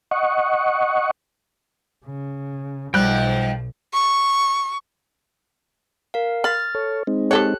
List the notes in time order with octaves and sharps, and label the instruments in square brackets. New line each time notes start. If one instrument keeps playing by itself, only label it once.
[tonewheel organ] D#5 F#5 C#6
[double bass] C#3
[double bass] B1 [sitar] G#2 F3 [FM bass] G3 [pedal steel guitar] G5 F#6
[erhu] C#6
[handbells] A#4 F5
[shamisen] B5 [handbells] F6 A6
[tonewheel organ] A4 C#5
G#3 C4 D#4
[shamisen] G4 A4 C#5 [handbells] F#6